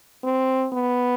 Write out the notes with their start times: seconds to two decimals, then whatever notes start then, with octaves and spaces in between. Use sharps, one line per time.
0.24 C4
0.73 B3